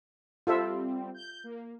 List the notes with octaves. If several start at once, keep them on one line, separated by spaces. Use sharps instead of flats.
G3 C4 F4 A4 E5
G6
A#3